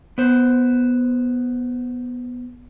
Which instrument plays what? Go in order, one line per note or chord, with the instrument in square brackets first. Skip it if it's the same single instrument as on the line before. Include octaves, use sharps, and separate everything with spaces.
[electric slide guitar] B3 C5